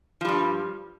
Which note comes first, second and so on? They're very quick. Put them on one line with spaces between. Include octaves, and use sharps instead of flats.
F3 G3 G2